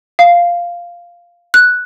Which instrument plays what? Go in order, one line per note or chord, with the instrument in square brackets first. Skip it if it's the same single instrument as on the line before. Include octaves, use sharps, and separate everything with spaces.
[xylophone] F5
F#6